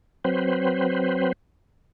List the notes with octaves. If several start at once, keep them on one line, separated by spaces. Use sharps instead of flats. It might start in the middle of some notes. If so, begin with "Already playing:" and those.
F#3 C4 B4 C5